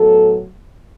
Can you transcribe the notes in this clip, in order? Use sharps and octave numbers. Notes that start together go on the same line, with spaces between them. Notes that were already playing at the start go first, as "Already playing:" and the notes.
Already playing: A2 F#3 B3 A4